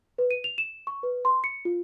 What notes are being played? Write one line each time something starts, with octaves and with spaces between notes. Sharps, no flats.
B4
D#7
F7
E7
C#6
B4
C6
C#7
F4